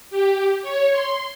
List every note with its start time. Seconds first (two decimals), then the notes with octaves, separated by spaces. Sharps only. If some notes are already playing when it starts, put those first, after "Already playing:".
0.10 G4
0.62 C#5
0.92 C6